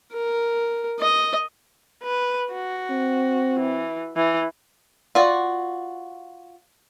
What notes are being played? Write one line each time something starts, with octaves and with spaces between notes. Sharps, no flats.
A#4
D#5
B4
F#4
C4
E3
E3
F4 F#4 D5